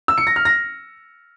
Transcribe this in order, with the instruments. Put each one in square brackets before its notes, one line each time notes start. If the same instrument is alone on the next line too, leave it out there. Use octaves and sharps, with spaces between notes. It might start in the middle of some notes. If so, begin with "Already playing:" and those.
[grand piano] E6
C#7
A#6
F6
A#6